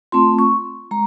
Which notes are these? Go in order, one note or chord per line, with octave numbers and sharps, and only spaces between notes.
A3 C4 F4 C6
C#6
G#3 A#5